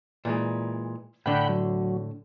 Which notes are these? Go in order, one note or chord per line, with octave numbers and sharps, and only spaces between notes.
A#2 E3 G#3
A2 D3 F#5 G5 B5
F#3